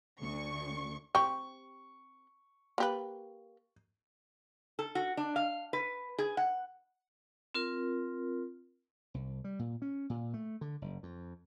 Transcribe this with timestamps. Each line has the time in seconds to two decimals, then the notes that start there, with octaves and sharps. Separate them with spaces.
0.21 D2 C#6
1.15 C4 G4 C#6
2.78 A#3 G4 B4
4.79 A4
4.95 F#4
5.17 D4
5.36 F5
5.73 B4
6.18 G#4
6.37 F#5
7.55 C4 F4 A#4
9.14 C2
9.44 G3
9.59 A#2
9.82 C#4
10.10 A#2
10.34 A3
10.61 D3
10.82 F#1
11.03 F2